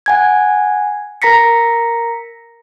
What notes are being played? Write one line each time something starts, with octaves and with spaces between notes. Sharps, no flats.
F#5 G#5 G#6
A#4 A#5 A#6 B6 C#7